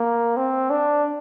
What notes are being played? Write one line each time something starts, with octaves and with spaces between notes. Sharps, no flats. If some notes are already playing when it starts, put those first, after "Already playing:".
Already playing: A#3
C4
D4